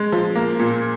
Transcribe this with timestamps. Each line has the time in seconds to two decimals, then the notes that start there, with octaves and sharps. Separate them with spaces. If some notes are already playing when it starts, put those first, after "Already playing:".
Already playing: G#3
0.12 F3
0.35 A#3
0.59 A#2